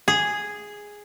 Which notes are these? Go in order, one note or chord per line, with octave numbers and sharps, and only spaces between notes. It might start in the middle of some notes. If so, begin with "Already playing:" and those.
G#4